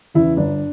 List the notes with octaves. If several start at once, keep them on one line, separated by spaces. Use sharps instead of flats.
E2 C#3 E4
G1 D4